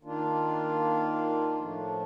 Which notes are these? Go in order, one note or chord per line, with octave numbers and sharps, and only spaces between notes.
D#3 A#3 D4 F4
A2 F3 A3 D4